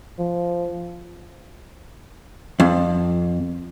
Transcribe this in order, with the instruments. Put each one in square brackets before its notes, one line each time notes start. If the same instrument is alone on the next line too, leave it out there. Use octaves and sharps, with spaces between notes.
[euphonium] F3
[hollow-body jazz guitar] F2